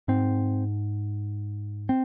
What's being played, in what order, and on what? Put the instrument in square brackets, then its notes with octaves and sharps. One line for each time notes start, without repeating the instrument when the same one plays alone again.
[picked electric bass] G#2 C4
C4